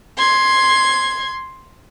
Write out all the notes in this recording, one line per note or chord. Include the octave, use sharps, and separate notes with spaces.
C6 G#6